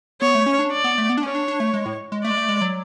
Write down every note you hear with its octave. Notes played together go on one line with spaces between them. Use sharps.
B3 C#5
A3
C#4
D4
D5
B3
A3
B3
D4
C#4 C#5
D4
D4
A3
G#3
A2
G#3
A3 D5
G#3
A3
G#3
F#3